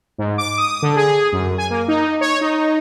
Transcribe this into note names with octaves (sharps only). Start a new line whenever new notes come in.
G#2
D6
D#6
D3
G#4
F#2
G#5
A#3
D#4
C#5
D#4